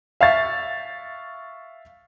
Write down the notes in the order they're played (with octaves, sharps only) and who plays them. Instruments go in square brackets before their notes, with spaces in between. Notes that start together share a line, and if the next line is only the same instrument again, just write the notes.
[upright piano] E5 F5 C#6 A6